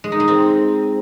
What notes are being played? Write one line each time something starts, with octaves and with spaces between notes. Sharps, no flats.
G#3
D#4
G#3
C4